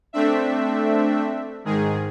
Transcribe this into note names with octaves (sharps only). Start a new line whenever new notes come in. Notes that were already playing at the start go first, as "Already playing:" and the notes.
A3 C4 D4 E5
G#2 D#3 G#4